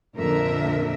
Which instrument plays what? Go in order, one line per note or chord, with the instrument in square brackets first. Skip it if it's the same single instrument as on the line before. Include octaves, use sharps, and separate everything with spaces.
[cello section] F2 A#2 D3 A#4 E5